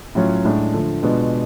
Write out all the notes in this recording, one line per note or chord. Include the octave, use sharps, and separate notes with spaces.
A2 F#3 C#4 F4
A2 G#3 D4
D3 F3 A3
B2 G#3 B3 D4 F4